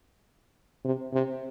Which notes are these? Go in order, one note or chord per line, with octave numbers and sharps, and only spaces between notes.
C3
C3